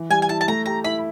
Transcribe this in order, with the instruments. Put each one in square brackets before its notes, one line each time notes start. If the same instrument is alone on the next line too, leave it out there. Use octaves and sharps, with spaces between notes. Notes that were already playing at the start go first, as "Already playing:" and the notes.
Already playing: [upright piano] E3
[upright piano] G3 [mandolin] G#5
[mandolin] G#5
[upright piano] E4 [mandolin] A5
[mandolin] A5
[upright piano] A3 [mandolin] A#5
[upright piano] G4 [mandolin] A#5
[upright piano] E4 [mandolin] B5